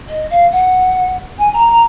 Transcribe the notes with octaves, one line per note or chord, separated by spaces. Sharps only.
D#5
F5
F#5
G#5
A#5
A#5